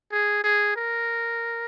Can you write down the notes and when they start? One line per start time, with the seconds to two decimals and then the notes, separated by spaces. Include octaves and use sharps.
0.12 G#4
0.44 G#4
0.76 A#4